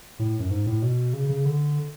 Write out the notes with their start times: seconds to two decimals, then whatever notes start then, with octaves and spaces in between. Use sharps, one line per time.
0.19 A2
0.40 F#2
0.50 G#2
0.66 A2
0.82 B2
1.13 C#3
1.29 C#3
1.45 D3